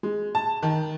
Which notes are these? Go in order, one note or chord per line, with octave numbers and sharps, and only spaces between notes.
G#3
A5
D#3